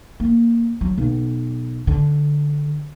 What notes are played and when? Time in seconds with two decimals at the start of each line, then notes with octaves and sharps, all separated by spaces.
0.20 A#3
0.81 F#3
0.98 B1
1.87 D3